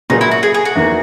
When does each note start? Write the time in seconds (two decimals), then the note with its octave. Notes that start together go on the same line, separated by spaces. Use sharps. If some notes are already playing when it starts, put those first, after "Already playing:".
0.10 A#2 F#3 C#4 D#4 G#4 B4
0.21 E4
0.31 F#4
0.43 G#4
0.54 G#4
0.65 F#4
0.76 E2 D#3 A#3